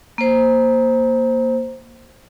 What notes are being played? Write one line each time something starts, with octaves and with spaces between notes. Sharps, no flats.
A#3 C5